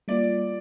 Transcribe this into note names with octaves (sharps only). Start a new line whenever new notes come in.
G3 A#3 F4 D5